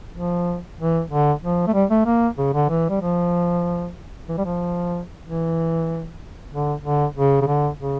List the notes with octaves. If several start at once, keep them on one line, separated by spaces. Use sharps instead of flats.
F3
E3
D3
F3
A3
G3
A3
A#3
C#3
D3
E3
G3
F3
E3
G3
F3
E3
D3
D3
C#3
C#3
D3
C#3